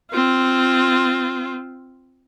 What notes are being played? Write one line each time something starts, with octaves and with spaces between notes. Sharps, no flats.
C4 F4